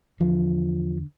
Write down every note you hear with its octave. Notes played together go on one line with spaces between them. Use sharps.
E2 D3 F3